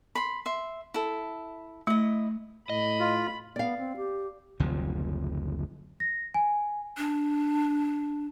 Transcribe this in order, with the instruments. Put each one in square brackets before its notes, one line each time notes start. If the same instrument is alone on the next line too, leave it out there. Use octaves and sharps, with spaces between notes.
[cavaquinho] B5 C6
E5 C6
E4 A4
[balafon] A3 [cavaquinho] E4 D#5
[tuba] A2 [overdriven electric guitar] D#5 [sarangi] B5
[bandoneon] F4
[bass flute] B3 [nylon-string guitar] D5 F5
[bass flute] C4
G4
[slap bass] F#1 D2 C3 F3
[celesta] A#6
G#5
[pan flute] D4